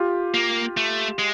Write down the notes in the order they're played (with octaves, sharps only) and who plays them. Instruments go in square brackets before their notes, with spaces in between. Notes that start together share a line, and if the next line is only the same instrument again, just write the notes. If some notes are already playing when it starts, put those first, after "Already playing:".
Already playing: [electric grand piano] F4 G4
[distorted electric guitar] A#3
A3
G#3